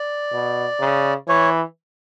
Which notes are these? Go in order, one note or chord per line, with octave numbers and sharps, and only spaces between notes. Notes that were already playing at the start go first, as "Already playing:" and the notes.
Already playing: D5
B2
C#3
E3 C#5